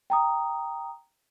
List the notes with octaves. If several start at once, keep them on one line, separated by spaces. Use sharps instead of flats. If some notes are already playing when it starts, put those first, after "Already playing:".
G5 A#5 D#6